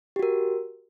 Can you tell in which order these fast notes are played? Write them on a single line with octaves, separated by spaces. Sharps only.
G4 F#4 A#4